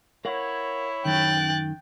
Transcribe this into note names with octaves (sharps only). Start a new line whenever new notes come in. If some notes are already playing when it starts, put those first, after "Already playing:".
E4 A#4 C#5 F5 F#5
F#2 D#3 G5 F#6 A6